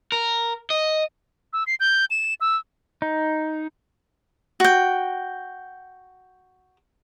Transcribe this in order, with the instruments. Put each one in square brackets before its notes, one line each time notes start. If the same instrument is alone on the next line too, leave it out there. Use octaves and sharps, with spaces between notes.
[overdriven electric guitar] A#4
D#5
[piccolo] E6
C7
G6
E7
E6
[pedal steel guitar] D#4
[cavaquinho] F#4 G5